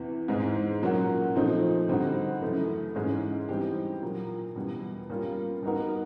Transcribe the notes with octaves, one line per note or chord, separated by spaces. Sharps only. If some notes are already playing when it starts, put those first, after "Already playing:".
Already playing: E2 C3 E3
G#2 E3 G#3 C4 D#4
A#2 F#3 A#3 C#4 F#4
A#2 F3 A3 C4 D#4
D3 G3 C4 D#4 F#4
F#2 C#3 E3 A3
G#2 E3 G#3 C#4
E3 G3 C4 D#4 G4
A#2 F#3 A#3
E2 B2 G3
G3 A#3 C#4 F4
G3 B3 D#4 F#4 A#4